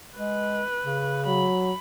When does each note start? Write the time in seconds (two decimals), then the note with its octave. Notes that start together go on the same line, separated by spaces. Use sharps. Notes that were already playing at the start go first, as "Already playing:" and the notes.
0.17 G#3 B4
0.85 C#3
1.26 F#3 B5